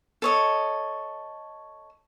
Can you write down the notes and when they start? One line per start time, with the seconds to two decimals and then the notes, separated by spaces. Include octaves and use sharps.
0.22 A4 C#5 D#5